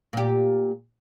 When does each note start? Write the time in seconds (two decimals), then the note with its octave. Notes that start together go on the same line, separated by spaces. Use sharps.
0.13 A#2 G4